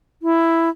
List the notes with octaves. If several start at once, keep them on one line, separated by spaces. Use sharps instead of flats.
E4